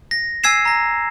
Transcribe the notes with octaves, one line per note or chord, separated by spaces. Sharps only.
A#6
G#5 E6 G#6 C7 E7
A#5 A#6